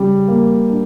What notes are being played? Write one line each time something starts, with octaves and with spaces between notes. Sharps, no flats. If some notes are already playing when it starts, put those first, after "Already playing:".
Already playing: C#3 G3
A#3
D4